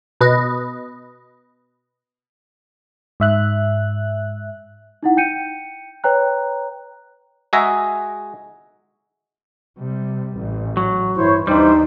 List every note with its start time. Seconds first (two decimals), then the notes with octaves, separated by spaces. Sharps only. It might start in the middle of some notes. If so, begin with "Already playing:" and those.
0.21 B2 B4 D#5
3.20 G#2 E5 F#6
5.03 D#4 E4 F#5
5.17 G5 G6 C#7 D#7
6.04 B4 C#5 G5 A#5 F#6
7.53 G#3 F#4 G#4 E5 A#5
9.78 C3 G3
10.37 A1
10.77 F#3
11.17 G2 E3 E4 C5 C#5
11.47 D#2 E3 G3 D4 D#4 G4 C5